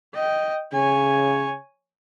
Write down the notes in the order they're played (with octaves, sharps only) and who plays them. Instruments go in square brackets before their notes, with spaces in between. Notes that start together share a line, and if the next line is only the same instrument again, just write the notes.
[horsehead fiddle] D#5 G5
[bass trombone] C#3 [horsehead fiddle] C#5 G#5